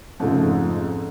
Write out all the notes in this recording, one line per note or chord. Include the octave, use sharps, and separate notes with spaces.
F2 G#2 C#3 A3